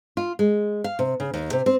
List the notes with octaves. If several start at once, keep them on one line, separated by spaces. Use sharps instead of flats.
F4
G#3
F5
C3
C#3
D#2
C3
C4